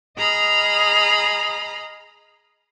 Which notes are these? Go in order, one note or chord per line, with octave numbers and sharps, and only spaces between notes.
G#4 D#5 A#5 B5 F6